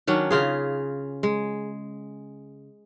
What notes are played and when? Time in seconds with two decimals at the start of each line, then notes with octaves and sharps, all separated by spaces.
0.07 D#3 F#3 C#4 D4
0.31 C#3 F4 G#4
1.23 G#3